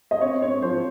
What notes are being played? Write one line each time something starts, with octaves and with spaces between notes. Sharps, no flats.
D#5
C4 C#5
C4 C#5
F3 C5